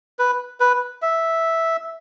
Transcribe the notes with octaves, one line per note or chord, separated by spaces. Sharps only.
B4
B4
E5